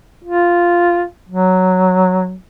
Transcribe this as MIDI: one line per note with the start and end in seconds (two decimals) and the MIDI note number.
0.25 1.04 65
1.29 2.36 54